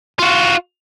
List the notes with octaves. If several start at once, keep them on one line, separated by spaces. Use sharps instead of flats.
F4 F#4